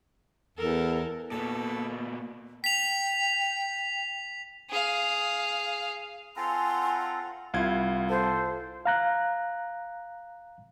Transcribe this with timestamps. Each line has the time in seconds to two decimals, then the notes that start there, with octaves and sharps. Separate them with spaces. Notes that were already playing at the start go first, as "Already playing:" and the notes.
0.57 E2 A4 A#4
1.31 A#2 A#3 B3 A4
2.64 G5 B6 F7
4.70 G#4 F5
6.37 C4 F4 A4 F5 F#5 G#5 A#5 C6
7.54 C2 E4 F4 F5 G#6
8.09 A4 C5
8.86 F5 A#5 F#6